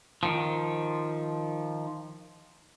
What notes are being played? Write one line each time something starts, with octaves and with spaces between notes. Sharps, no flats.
D#3 F3